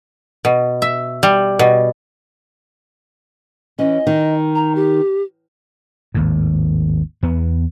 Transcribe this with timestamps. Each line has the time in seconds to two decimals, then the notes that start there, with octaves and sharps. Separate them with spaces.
0.45 B2
0.82 E5
1.23 G3
1.59 B2
3.79 E3 C#4 D#5
4.07 D#3
4.55 A#5
4.75 G4
6.14 G#1 D#2 A2
7.23 E2 B3